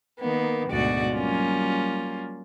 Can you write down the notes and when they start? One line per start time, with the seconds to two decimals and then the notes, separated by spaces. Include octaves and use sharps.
0.20 D#3 A#3 B3
0.69 D2 G#2 B2 F#4 D5
1.13 F#3 G3 A#3 C#4 F4